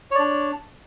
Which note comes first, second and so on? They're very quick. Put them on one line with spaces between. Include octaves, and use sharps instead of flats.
C#5 D5 D4